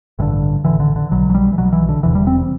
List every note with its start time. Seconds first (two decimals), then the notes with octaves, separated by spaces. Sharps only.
0.19 A1 G2 D3 E3
0.65 A1 G2 D3 E3
0.80 D3
0.96 D3
1.11 B1 B2 F#3
1.30 F#3
1.35 G3
1.53 E3
1.57 B1 B2 F#3
1.73 E3
1.89 D3
2.03 E1 E2 C3 E3
2.15 G3
2.27 C4